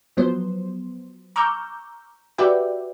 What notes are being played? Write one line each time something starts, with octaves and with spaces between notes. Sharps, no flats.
F3 F#3 B3 C5
A#5 C#6 D6 E6 F6 G6
F#4 G4 B4 D5 E5 G5